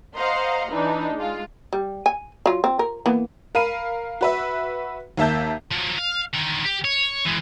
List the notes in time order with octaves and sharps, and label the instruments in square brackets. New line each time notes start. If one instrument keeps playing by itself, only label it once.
[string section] C5 D#5 F5 F#5 A#5 C6
E3 D4 D#4
G#3 F4
[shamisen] G3
G#5
F#3 F4
C4
A#4
E3 A#3 B3
[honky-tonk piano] A#4 F5 B5 D#7
F#4 B4 E5
D#2 A#3 E5 A5 G6
[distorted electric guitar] F3 F#3
F5
D3 D#3
G4
C#5
E3 G#3